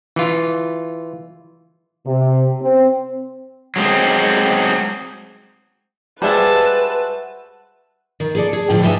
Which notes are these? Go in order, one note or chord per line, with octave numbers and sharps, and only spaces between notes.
E3 F4
C3
C4
F#3 G#3 C4
G3 G#3 F#4 B4 C5 E5 A5
D#3
G#4 A4 D5
G#4
A2 D3 D#3 F3 F4
G2 G3 D#4 A#4 E5 G#5